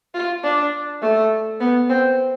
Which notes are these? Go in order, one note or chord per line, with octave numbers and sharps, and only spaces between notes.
F4
D4
A3
B3
C4